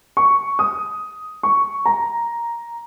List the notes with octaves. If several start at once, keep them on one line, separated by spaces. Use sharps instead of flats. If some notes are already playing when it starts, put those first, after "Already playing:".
C#6
D#6
C#6
A#5